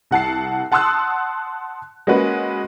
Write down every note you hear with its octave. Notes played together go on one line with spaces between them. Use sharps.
C2 F#5 A5 C7
F#5 A5 C6 D#6 E6 F#6
G#3 A#3 C#4 F#4 B4